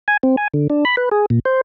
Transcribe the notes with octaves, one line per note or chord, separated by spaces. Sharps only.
G#5
C4
G#5
D3
D4
B5
B4
G#4
A#2
C5